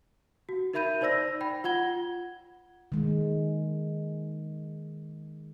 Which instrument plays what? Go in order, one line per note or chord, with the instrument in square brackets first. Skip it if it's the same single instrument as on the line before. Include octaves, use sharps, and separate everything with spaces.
[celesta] F#4
D#4 A#4 E5 B5 G6 D#7
D#4 C5 D5 E6 A#6
G5 B5
F4 F#5 G#6 G7
[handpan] D#3 G#3